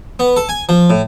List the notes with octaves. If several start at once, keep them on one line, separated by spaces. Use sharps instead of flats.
B3
A4
G#5
F3
A2